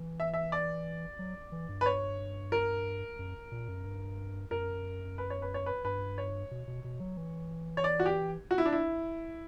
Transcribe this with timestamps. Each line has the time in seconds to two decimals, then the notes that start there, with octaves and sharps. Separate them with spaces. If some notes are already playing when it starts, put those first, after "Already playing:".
Already playing: E3
0.20 E5
0.34 E5
0.52 D5
1.19 F#3
1.52 E3
1.69 G2
1.81 B4
1.86 C#5
2.52 A#4
3.19 F#2
3.52 A#2
3.68 F#2
3.85 G2
4.51 F#2 A#4
5.18 B4
5.30 C#5
5.42 B4
5.54 C#5
5.66 B4
5.84 G2 B4
6.18 C#5
6.51 B2
6.68 B2
6.84 B2
7.00 F#3
7.17 E3
7.77 C#5
7.84 D5
8.00 F#4
8.06 G4
8.51 F#4
8.58 E4
8.65 D4
8.73 E4